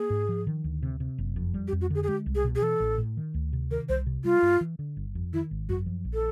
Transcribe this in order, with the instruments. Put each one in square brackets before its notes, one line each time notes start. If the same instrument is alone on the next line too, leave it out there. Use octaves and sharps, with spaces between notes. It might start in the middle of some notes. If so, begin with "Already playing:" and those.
Already playing: [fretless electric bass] A#3 [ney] G#4
[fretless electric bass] G#2
F3
D#3
D2
C3
C3
F#1
F2
G3
[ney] G4
[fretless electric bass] F2
[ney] F#4
[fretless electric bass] D3 [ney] G#4
[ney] G#4
[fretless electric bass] G#3 [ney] G4
[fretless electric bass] C2
[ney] G#4
[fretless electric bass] B2
[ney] G#4
[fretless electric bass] E3 [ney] A4
[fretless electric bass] A1
A2
D#3
D2
C3
[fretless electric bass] D#3 [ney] A#4
[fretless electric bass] C2 [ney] C5
[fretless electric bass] C3
[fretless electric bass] G3 [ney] F4
[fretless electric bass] G2
E3
D3
G1
F2
[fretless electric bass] D#3 [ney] E4
[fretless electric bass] G#1
[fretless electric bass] F#2 [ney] F#4
[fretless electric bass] F3
A#1
[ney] A4